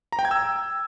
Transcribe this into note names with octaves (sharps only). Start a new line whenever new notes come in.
A#5
G5
G#6
E6